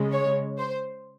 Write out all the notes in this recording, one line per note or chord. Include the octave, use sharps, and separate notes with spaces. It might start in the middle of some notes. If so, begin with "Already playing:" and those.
Already playing: C#3 G#3
C#5
C5